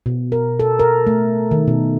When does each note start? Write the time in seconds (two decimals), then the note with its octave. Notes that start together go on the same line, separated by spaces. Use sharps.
0.06 B2
0.32 A#4
0.60 A4
0.79 A#4
1.07 A3
1.51 D#3
1.68 B2